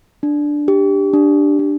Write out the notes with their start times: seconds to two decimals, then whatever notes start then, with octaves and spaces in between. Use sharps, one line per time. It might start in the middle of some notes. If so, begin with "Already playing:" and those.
0.23 D4
0.68 G4
1.14 D4
1.59 D4